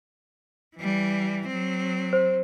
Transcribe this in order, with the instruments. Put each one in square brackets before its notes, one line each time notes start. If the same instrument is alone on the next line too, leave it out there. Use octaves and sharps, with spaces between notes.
[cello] E3 G3
F#3 C4
[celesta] C5